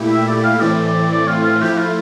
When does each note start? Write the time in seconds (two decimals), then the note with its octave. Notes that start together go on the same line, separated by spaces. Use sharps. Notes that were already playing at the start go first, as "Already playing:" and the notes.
Already playing: A#2 A3 E4 G4
0.11 E5
0.28 D5
0.44 F5
0.60 A2 E3 A3 C4 D5
0.86 D5
1.11 D5
1.27 F4
1.44 F4
1.61 F3 A3 E4 G4
1.78 F4